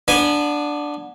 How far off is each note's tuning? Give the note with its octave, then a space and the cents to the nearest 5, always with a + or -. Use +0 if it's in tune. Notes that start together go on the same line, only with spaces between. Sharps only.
B3 -20 D4 +0 G#5 +0